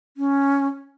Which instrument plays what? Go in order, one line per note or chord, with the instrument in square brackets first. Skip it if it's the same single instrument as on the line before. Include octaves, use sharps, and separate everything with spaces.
[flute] C#4